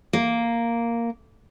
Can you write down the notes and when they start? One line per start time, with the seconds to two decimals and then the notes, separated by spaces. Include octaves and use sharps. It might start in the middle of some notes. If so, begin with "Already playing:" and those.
0.13 A#3